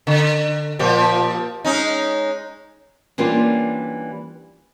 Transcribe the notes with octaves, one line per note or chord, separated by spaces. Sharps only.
D3
A#2 F3 G4
G#3 C#4 D#4
E3 G3 A#3 C#4 D4 F4